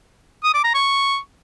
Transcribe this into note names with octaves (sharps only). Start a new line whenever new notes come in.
D#6
D6
A#5
C#6